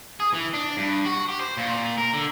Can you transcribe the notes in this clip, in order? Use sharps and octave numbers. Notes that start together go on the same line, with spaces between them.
G#4
E3
D4
G2
F#4
G4
C5
A#2
A#4
D3